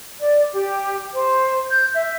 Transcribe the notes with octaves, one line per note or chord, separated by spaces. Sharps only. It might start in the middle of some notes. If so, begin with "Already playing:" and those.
D5
G4
C5
G6
E5